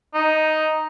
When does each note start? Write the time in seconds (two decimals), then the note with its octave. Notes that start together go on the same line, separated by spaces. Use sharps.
0.14 D#4